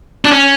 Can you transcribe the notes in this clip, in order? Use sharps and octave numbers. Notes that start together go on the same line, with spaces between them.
D4
C#4